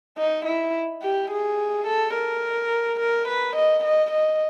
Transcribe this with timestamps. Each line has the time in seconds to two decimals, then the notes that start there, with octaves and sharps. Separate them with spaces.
0.18 D#4
0.46 E4
1.03 G4
1.31 G#4
1.87 A4
2.14 A#4
3.00 A#4
3.28 B4
3.56 D#5
3.84 D#5
4.11 D#5